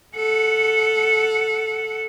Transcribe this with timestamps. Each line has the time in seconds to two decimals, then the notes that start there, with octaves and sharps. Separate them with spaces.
0.16 A4 F#5